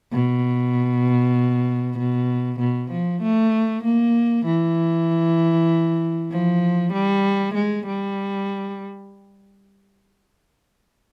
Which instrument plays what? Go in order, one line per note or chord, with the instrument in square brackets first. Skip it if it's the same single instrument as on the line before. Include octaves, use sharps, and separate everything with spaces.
[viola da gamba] B2
B2
B2
F3
A3
A#3
E3
F3
G3
G#3
G3